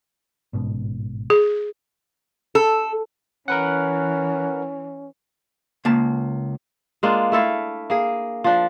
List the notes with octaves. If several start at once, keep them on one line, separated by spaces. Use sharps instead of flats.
A1 G#2 B2
G#4
A4
E3 C#4 A#4 B4 F#5
C#2 A#3 A5
G#3 A#3 D4 F4
A3 E4 A4 F5
A#3 G#4
F3 D4